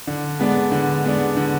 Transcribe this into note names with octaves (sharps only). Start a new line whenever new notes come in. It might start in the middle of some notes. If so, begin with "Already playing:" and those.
D3
G#3 B3 D4
D3
G#3 B3 D4
D3